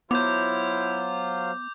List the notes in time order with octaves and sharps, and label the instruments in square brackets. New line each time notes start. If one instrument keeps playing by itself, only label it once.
[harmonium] F#3 F4 C5 [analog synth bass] B3 [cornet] E4 [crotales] D6 G6